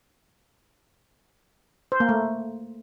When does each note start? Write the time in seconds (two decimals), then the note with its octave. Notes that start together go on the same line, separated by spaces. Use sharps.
1.92 C5
2.00 A#3
2.09 A3